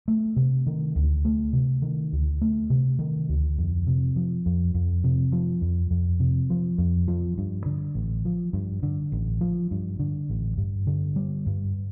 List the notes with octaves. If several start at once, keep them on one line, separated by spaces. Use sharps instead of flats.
A3
C3
D#3
D2
A3
C3
D#3
D2
A3
C3
D#3
D2
F2
C3
F3
F2
F2
C3
F3
F2
F2
C3
F3
F2
F3
G2
D3
A1
F3
G2
D3
A1
F3
G2
D3
A1
G2
D3
G3
G2